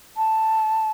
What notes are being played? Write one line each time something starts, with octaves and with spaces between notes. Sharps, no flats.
A5